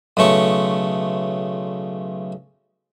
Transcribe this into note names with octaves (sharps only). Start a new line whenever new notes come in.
B1 C#3 A3 C#6